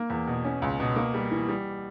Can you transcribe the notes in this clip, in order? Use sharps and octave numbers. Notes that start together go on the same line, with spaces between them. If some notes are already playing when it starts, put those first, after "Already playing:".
Already playing: A#3
E2
B2
C#4
C#2
B2
A#3
G3
E3
G3